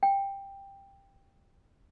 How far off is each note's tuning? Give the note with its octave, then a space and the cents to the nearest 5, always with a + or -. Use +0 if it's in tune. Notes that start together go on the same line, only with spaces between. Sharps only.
G5 +10